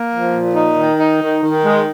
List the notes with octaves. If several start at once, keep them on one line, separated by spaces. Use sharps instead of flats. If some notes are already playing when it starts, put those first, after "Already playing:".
Already playing: A#3
F3
A#2
D#4
D#3
D#4
D#3
D#3
G#3